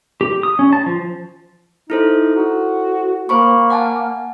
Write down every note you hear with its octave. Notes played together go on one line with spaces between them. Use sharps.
G4
D#6
C#4
A5
F3
D#4 E4 A4 C5
F#4
A#3 C5 B5 C#6
F#5 G#5 A5